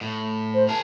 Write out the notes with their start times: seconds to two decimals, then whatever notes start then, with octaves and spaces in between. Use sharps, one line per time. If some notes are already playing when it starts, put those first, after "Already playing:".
0.01 A2
0.54 C5
0.69 G#4 A#4 A5